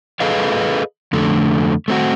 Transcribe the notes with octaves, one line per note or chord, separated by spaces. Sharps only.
G#4 A4 B4 D#5 F5
F2 D3 A3
A3 C4 F#4